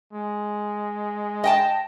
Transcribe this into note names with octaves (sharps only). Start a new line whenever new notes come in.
G#3
D#5 G5 A5